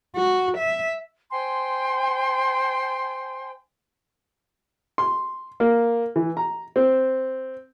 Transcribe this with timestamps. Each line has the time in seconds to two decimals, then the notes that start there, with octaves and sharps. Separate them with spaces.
0.16 F#4
0.58 E5
1.31 C5 G5 G#5 C6
4.98 C6
5.60 A#3
6.16 E3
6.37 A#5
6.76 C4